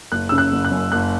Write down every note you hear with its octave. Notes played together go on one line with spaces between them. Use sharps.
F#1 F#6
C#3 E6
F#6
F#1
F#6
F#2
F#1 F#6